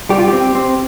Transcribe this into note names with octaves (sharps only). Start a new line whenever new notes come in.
G3 G4
F4
C4 G4
C4